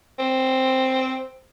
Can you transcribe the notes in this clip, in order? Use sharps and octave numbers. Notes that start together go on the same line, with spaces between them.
C4